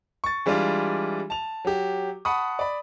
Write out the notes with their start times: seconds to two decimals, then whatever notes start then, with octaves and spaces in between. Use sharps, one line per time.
0.24 C#6 A6
0.46 E3 G3 G#3 D4 F4
1.30 A5 F7
1.65 F#3 G4
2.25 F#5 A5 B5 C#6 D#6
2.59 D5 B5